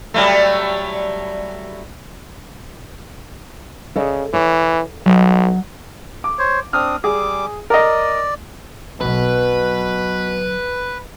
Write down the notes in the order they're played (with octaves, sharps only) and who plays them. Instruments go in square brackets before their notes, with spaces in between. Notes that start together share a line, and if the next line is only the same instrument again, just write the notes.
[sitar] F#3 G3 A3
[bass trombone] C#3 [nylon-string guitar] A4 D5 D#5
[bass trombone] E3 [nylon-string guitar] C#5
[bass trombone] B1 [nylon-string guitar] F#3 D#5
[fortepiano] D6
[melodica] C5 C#5
[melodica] C4 D4 D#6 [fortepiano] F6
[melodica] G3 D6 [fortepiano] G#4
[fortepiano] A#4 D#5 [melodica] D5
[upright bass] B1 F#3 [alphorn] B2 [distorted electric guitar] B4